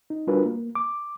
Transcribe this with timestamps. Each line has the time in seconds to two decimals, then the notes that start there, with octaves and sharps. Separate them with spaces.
0.10 D#4
0.27 G3 D4 F4 F#4 A#4 B4
0.45 A#3
0.75 D6